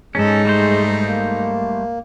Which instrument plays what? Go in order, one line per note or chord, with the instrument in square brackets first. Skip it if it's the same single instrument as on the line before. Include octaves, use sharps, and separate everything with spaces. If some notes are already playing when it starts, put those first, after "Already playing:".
[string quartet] G#2 D#4 [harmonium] G#3 [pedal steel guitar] C#4 A4
[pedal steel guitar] G3 A3 C5
[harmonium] A#3